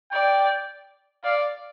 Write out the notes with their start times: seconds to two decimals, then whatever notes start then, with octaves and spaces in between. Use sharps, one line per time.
0.12 D5 G5
1.24 D5 F5